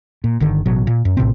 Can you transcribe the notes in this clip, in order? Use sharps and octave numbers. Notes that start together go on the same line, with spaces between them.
A#2
G1 D3 D#3
A1 B2 F#3
A#2
F#2
A#1 A2 C3 C4